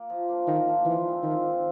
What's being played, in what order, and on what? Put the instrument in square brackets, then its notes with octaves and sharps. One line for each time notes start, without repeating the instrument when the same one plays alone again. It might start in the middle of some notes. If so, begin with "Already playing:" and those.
Already playing: [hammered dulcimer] A#3
F3
A#3 D4 F4
[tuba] D#3 [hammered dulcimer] F3
[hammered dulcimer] A#3 D4 F4
[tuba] E3 [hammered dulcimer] F3
[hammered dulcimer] G#3 C4
[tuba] D#3 [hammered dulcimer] F3
[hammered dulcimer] G#3 C4